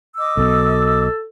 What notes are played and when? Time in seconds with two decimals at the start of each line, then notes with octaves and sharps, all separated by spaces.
0.16 D#5 D6 E6
0.37 B1 B2 A4